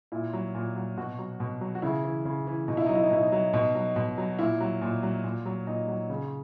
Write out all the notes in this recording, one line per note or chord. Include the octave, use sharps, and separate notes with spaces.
A#2 E4
F#3
A#2
F#3
B2 F#4
F#3
B2
F#3
F#4
C#3 E4
E3
C#3
E3
B2 D#4
E4
F#3 D#4
E4
D#4
B2 E4
D#4
F#3
B2 D#4
F#3
B2
F#3
A#2 E4
F#3
A#2
F#3
A#2
F#3
A#2 D#4
F#3
C#3